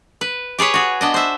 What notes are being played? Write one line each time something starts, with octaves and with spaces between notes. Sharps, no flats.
B4
G4 G#4 B4 C#5
F#4 G#4
B3 D4 D#5
C5 E5